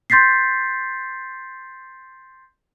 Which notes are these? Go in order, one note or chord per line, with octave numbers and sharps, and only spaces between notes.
C6 G6 A6 B6 C7